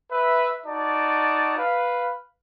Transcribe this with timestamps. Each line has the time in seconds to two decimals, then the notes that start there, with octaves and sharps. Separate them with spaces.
0.11 B4 E5
0.66 D#4 F#4 D5 A5
1.58 B4 F5